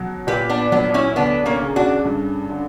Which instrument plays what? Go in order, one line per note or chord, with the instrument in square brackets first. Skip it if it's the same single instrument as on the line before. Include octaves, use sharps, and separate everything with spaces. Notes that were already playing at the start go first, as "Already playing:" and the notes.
Already playing: [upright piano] B2 F#3
[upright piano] A#2 [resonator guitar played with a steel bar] G4 B4
[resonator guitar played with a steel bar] B3 D4
[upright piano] F#3 [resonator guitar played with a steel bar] B3 D4
[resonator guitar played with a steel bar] C#4 E4
[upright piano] D2 [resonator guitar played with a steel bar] B3 D4
[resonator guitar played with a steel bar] A#3 C#4
[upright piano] C#3
[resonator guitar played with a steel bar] D4 F#4
[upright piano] G2
D3